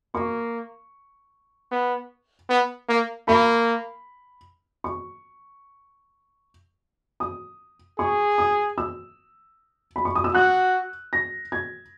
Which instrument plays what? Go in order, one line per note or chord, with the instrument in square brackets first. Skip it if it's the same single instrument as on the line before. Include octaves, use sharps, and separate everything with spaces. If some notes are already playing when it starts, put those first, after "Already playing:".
[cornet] A#3 [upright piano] C#6
[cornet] B3
B3
A#3
[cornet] A#3 [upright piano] B5
[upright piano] C#6
D#6
[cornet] G#4 [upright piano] C#6
[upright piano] D#6
E6
B5
C#6
D#6
E6
[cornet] F#4 [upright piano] F#6
[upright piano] A#6
G#6